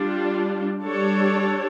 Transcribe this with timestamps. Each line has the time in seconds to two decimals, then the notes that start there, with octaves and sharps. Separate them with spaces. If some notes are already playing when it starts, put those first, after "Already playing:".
Already playing: G3 D4 F4
0.83 G3 D4 A4 C#5